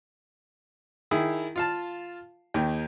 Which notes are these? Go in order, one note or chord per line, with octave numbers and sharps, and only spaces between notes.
D#3 E4 G#4
F4 F5 A5
D#2 D#3